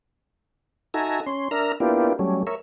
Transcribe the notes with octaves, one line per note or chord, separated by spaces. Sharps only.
D#4 F#4 A4 E5 G#5 A#5
C#4 C6
D4 A#4 E5 A#5 F6
A#3 B3 D4 E4 F4 G4
F#3 G3 A3 C#4
A#4 C#5 E5